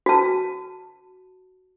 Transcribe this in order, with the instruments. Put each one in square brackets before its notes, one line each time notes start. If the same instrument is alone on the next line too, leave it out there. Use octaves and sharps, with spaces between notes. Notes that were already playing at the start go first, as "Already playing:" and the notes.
[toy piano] F#4 A5